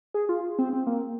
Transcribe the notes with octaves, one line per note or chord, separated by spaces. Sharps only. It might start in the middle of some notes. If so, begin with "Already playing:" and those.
G#4
F4
C4
C4
A#3